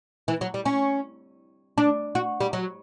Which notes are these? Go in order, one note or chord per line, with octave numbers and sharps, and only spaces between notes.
E3
F#3
G3
C#4
D4
F#4
G3
F#3